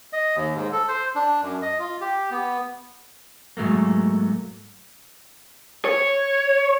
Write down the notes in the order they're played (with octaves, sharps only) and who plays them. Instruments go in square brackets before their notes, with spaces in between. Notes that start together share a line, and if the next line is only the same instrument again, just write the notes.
[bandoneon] D#5
D#2
G#2
A4
C5
D4
F#2
D#5
F4
G4
B3
[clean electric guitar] G#2 F#3 A3 A#3
[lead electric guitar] C#5